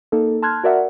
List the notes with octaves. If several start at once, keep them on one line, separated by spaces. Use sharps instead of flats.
A#3 D#4 A4
A5 C6 F6 F#6 G#6
F#4 A#4 D5 E5 F#5